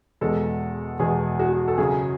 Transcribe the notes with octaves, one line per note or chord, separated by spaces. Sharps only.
E2 B2 G#3 A4
E2 B2 G#3 G#4
F#4
A4
F#2 C#3 F#3 G#4